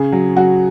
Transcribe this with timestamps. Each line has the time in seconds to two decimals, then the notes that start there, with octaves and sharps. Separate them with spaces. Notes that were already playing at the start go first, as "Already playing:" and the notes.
Already playing: C#3 G#4
0.12 F#3
0.36 F#3 F#4